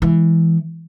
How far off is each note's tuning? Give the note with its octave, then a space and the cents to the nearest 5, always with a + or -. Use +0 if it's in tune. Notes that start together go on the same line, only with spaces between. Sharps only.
E3 +0 G#3 +0